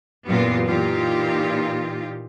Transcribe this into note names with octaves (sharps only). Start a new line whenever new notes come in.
F#2 A#2 E3 B3 F4 G4
A#2 E3 D#4 F4 G4